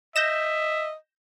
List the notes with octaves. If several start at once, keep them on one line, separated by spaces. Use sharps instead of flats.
D#5 E5 G6 A#6 E7